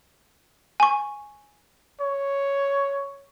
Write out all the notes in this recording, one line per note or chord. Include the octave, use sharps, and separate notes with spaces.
G#5 C#6
C#5